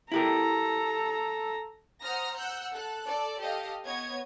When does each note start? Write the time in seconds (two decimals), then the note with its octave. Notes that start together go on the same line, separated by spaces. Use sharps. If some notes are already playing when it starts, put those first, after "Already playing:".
0.12 E4 G4 A4 A#4 A#5
2.02 C5 F#5 A#5 D#6 F6 A#6
2.35 F#5 E6 F#6 G6
2.73 A4 F#6
3.05 A4 D5
3.41 G4 A4 D#5 F5
3.84 B3 C#5 D#5 G#6